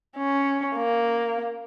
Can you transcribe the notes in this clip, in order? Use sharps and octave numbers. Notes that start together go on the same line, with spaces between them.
C#4
A#3